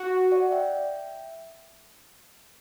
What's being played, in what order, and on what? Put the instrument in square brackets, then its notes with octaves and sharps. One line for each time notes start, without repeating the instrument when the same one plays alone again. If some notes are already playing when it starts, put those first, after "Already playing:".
Already playing: [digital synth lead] F#4
[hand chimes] D5 F#5
E5 G5